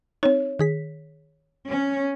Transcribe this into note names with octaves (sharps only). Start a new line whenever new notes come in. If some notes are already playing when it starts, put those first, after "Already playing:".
C4 D#4 C#5
D#3 G#4 B6
C#4